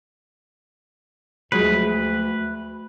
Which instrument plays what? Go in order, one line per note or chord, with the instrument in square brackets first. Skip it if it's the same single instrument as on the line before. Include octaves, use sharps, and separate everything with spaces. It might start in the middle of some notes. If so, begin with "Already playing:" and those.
[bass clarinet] D2 [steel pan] F3 F#3 G#3 [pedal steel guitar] B4